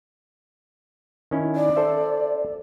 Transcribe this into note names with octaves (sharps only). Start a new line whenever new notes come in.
D#3 C#4 E4
D5
A4 C5 E5